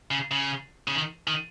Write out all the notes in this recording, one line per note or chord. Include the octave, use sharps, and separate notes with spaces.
C#3
C#3
C#3
D#3
D#3